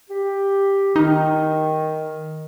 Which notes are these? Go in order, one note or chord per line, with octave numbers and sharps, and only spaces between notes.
G4
D#3 D#4